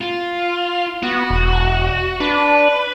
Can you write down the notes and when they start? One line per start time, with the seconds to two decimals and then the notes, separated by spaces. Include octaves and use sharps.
0.01 F4
1.03 B3 F#4
1.30 E1
2.20 D4 B4